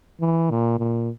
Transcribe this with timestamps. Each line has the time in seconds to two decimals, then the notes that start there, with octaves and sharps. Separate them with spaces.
0.21 E3
0.50 A#2
0.79 A#2